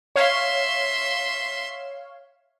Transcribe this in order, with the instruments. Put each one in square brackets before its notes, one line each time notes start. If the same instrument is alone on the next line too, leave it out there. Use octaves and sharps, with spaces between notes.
[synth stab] C#5 F5 [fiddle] E5 C6